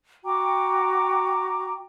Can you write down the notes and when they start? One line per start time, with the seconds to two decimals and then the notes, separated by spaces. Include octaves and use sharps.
0.24 F#4 G5 A#5 D6